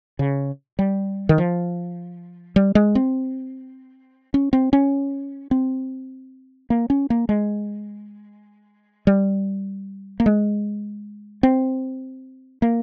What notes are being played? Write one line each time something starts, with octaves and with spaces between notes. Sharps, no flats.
C#3
G3
D#3
F3
G3
G#3
C4
C#4
C4
C#4
C4
A#3
C#4
A#3
G#3
G3
A#3
G#3
C4
A#3